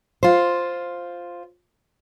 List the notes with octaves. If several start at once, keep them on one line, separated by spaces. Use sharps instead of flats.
F4 C5